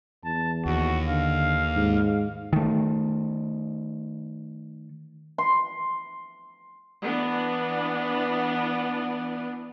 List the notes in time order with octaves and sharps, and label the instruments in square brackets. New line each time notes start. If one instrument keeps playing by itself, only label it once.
[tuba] E2 [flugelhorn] A5
[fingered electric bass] D#2 [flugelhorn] F#4
[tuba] D3 [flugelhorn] F5
[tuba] G#2
[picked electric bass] D#3 A3
[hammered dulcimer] C6
[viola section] E3 B3 D4